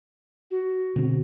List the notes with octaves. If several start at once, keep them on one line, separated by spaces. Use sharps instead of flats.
F#4
B2 D3 C4